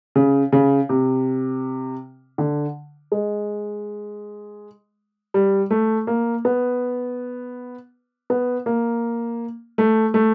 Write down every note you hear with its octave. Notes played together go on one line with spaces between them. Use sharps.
C#3
C#3
C3
D3
G#3
G3
A3
A#3
B3
B3
A#3
A3
A3